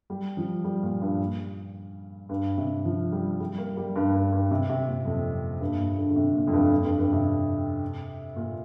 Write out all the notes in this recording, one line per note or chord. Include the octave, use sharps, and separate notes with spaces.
G3
F3
G3
A#2
G2
G2
C3
F3
G3
G3
A#3
G3
G2
G2
G2
C3
C3
A#2
F2
G2
A#2
D3
D3
C3
A#2
F2
G2
F2
G2
G2
C3
A#2